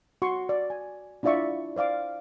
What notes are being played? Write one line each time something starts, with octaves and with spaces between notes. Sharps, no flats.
F#4 C6 C#6
D5
G#5
D4 E4 F4 D5 E5 C#6
C5 D5 F5 D6